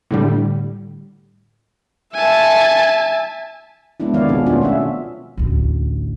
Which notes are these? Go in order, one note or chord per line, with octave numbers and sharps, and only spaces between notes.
A2 D3 G3
E5 G#5 A5
G#3 B3 D4 E4
D#3 F3 B3 C#5 D5 F5
B2 C4 D4 G#4
A3 B3 C#4 D4 F4 F#4
F4 G#4 E5
A1 D2